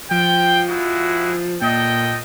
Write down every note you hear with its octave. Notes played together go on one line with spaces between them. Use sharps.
F3 G5
G#3 E4 F#4
A#2 A4 D#5 G5